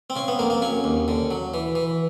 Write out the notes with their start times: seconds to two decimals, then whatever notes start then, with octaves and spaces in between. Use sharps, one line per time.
0.10 C4
0.16 C#3 C#4
0.28 B3
0.39 F2 A#3
0.50 A#3
0.62 F#3 C#4
0.84 D#2
1.08 D3
1.31 F#3
1.54 E3
1.75 E3